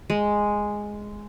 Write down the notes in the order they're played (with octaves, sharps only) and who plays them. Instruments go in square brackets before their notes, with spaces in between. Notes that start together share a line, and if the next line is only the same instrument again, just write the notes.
[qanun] G#3